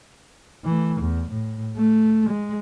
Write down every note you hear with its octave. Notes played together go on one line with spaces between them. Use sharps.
E3 A3
E2
A2
A3
G#3